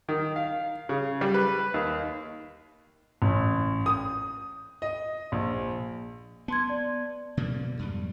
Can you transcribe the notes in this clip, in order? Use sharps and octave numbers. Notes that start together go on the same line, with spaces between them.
D#3
F5
C#3
G3
B4
D#2
A1
D#6
D#5
A#1
B3 A5 C6 G#6
D5
B2 D3 A#3
F2 G#2 G3